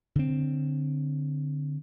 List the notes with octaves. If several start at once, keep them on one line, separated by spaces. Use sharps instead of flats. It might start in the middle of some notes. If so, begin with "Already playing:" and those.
D3 C4